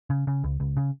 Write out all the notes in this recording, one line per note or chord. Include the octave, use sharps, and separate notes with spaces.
C#3
C#3
C#2
C#2
C#3